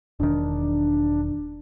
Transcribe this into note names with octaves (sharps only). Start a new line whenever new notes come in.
E1 D#3 D4